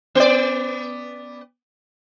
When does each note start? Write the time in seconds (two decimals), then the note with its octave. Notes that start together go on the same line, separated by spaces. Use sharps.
0.15 B3 D5